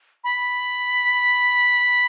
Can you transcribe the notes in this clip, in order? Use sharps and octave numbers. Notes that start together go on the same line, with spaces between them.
B5